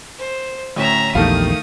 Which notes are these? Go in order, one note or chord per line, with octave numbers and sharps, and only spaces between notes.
C5
D2 A2 C#4 E5 A#5
A#1 E2 D#3 G3 A3 F5 D#6